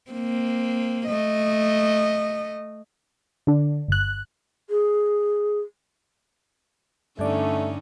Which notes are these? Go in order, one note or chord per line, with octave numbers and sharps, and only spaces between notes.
A#3 C4
A3 D#5
D3 D4
G1 F#6
G#4
G2 D3 A3 C#4 D#4 D5